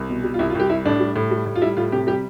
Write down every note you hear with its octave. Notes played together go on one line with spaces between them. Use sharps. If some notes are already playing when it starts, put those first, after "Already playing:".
Already playing: C2
B2
G3
F4
C2 E4
F4
C2 G4
G3 E4
A2 D4
G3
A2
G3
A2
F4
G3 E4
A2 F4
C3 G4
G3 G4